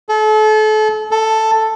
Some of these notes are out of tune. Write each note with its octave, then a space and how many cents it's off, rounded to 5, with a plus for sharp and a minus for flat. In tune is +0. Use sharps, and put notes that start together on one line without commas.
A4 -35
A4 +5